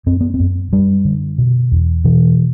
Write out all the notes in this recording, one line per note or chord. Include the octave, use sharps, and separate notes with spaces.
F#2 C4
B3
C4
F#2
F#2 G3
D3
B2
E2
B2 E3